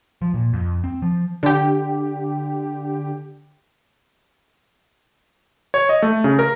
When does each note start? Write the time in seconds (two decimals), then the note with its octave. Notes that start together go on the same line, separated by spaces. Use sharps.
0.22 F3
0.34 A#2
0.53 F2
0.84 C4
1.02 F3
1.43 D3 G4
5.74 C#5
5.89 D#5
6.02 A3
6.24 C#3
6.39 A#4